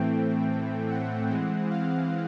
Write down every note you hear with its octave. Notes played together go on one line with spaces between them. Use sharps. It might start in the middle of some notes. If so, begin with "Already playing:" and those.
Already playing: A2 E3 A3 C4 G5
F#5
E3 G#3 C4
F5